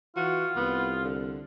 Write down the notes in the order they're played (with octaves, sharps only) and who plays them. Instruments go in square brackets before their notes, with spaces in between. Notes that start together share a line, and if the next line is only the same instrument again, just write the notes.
[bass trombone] E3 [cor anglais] F4 [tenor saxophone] F#4
[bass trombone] C2 [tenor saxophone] B3
[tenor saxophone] D3